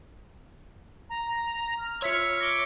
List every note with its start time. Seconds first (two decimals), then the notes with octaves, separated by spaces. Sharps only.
1.10 A#5
1.79 F6
2.02 F4 C#5 E5 C6 E6 B6 C#7
2.41 D6 A#6 C#7 G7